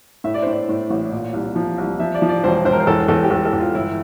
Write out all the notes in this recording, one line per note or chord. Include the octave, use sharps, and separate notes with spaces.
A2 E5
D5
C5
A2 D5
A2
A1
A#2
C2
F3
C2
F3 E5
D5
F3
D5
E1 C5
E1 C5
A#4
C5
E2 A4
E2 A4
G4
E2 A4
A4
E2
F4
G1 E4